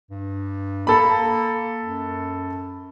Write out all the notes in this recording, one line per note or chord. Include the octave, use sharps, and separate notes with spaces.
G2
A#3 A4 B5
F#2